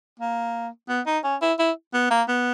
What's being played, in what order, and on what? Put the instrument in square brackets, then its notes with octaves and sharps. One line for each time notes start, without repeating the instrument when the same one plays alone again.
[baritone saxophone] A#3
B3
D#4
C#4
E4
E4
B3
A#3
B3